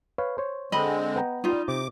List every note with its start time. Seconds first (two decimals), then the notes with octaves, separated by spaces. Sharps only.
0.18 B4 C#5 F5
0.38 C5 C#5
0.72 D3 G#3 C4 D#5 B5
1.16 B3 G5 A#5
1.44 G3 D#4 F4
1.68 C3 D6